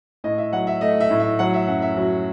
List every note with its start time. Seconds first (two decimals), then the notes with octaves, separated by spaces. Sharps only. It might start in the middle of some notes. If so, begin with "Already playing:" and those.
0.24 A2 D#5
0.38 E5
0.53 F#3 F#5
0.67 E5
0.81 A3 D#5
1.00 E5
1.10 A2
1.20 E5
1.39 F#3 F#5
1.54 E5
1.67 F#2 F#5
1.82 E5
1.97 F#3 F#4